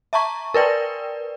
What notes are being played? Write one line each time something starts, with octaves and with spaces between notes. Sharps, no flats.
E5 A5 A#5 C#6
A#4 B4 D5 G5